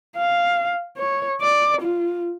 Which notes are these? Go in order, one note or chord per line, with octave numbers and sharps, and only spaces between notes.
F5
C#5
D5
F4